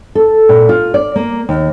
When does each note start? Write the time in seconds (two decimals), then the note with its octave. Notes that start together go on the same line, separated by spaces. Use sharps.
0.15 A4
0.49 A#2
0.69 F4
0.94 D5
1.16 A#3
1.49 D#2